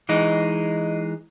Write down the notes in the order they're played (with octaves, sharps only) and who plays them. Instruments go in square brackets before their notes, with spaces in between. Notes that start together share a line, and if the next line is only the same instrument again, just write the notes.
[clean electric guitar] E3 G#3 D#4